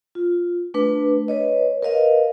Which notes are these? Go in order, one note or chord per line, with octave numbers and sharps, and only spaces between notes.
F4
A3 D4 B4
B4 C#5 D#5
A#4 B4 D#5 F5